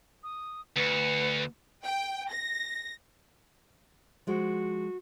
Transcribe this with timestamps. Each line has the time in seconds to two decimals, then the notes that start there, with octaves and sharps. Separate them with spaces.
0.23 D#6
0.76 D2 B4 C#7
1.83 G5
2.30 A#6
4.27 F3 G#3 F#4